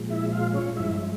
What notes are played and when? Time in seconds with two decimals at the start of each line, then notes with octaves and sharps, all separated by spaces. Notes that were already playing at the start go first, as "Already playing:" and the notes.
Already playing: A#2 F3 G#3
0.10 E4 E5
0.32 F4 F5
0.54 C#4 C#5
0.76 G2 F3 G#3 E4 E5